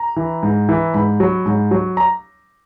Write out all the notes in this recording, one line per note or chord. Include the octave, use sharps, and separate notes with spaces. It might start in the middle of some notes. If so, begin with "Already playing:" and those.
Already playing: A#5
E3
G#2
E3
G#2 B5
F#3
G#2
F#3
A#5